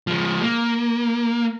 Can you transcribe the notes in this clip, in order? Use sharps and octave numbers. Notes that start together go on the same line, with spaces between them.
F3 G#3
A#3